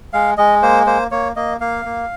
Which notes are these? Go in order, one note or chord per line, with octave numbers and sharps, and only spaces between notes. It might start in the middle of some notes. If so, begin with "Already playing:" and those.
G#3 F5
G#3 D#5
A#3 C5
A#3 C5
A#3 C#5
A#3 D#5
A#3 F5
A#3